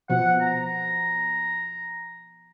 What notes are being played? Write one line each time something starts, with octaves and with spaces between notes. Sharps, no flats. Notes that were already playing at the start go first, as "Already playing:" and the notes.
B2 F3 F#5
A#5